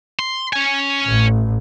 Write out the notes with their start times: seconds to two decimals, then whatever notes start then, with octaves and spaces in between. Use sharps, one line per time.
0.19 C6
0.53 C#4 G#5
1.02 A1 A2